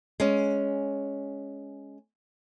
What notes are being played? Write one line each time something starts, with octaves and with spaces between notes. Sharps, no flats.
G#3 C#4